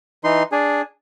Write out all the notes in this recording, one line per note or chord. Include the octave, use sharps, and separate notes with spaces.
E3 D#4 C6
D4 G#4